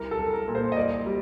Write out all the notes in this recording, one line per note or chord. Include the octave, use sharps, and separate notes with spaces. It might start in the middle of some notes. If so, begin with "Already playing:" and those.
Already playing: C2 A#4
A4
C2
A#4
A#2
C5
D#5
C2 D5
G3